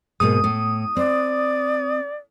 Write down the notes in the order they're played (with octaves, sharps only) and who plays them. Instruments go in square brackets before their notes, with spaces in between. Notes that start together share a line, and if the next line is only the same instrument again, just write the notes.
[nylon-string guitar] G#2 B2 A#3 [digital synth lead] D#6
[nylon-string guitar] A2
[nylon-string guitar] C4 [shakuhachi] D5